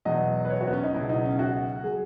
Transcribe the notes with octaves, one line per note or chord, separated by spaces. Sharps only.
E2 B2 F#3 D#5
B4
C#5
F#4
B3
C#4
D#4
C#2 B2 F#3 E4
D#4
C#4
F#4
F#3 G#4